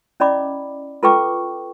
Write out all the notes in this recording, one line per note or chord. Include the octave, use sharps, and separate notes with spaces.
C#4 E4 D5 D#5 B5 D6
F4 A4 B4 G5 C#6 D6